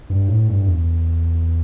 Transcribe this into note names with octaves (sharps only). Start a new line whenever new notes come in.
G2
A2
G2
E2